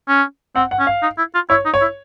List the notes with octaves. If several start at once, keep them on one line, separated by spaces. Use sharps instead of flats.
C#4
C4 F#5
F#5
C#4
F5
D#4
E4
F4
E4 C#5
D#4
C#5
E4